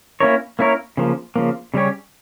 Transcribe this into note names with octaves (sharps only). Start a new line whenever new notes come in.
A#3 C#4 E4 A#4 C#5
A#3 C#4 E4 A#4 C#5
C#3 F3 A#3
C#3 F3 A#3
C#3 G3 C#4 G4 C#5